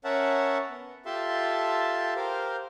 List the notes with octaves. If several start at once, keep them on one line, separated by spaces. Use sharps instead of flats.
C#4 A#4 C#5 E5 F#5 A5
B3
F4 G4 A4 E5 A5 C6
G4 A#4 C5 F5